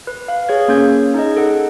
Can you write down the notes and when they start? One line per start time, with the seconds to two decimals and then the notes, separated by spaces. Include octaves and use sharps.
0.07 B4
0.28 F5
0.49 G#4 C#5 G#6
0.68 A#3 C#4 G6 G#6
1.14 D#4 G#4 D#5
1.37 A4 F#5